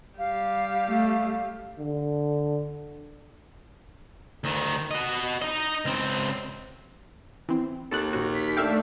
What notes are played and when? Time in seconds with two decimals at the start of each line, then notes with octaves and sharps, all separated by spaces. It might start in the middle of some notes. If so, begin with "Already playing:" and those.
0.19 G3 G4 F5
0.88 A3
1.79 D3
4.44 D2 D#3
4.91 F#4 D#5
5.42 D#4 D#5
5.85 C#2 C4
7.49 E3 C4
7.91 D#2 A4 A5 F#6
8.13 A#1 C#4 F#4
8.33 B6
8.57 A3 D4 E5 F5 G5